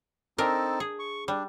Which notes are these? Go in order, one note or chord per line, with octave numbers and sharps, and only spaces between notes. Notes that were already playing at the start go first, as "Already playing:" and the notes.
C4 D4 D#4 A4 A#4
G#4
C#6
G3 D4